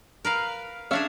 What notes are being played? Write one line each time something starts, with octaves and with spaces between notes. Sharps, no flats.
A#4 B4 F5
C#4 D4 G#4 C#5 E5 F5